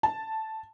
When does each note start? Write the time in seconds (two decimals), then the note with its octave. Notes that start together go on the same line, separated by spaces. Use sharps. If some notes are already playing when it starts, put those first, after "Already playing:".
0.03 A5